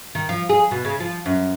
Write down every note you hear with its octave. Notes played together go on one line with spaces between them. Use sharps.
D#3
F3
G#4
B2
C#3
F3
F#2